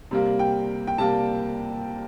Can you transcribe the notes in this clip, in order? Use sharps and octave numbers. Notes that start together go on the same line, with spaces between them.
C3 G3 A#3
G5
G5
C3 G3 A#3 A5